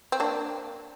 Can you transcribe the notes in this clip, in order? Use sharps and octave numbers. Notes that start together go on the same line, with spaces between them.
C4
A#3 D4